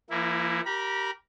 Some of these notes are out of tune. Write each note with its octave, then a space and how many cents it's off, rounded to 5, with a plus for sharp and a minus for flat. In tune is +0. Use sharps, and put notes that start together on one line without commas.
F3 -40 A#3 +0 E4 +0
G4 -15 A#4 +0 B5 -35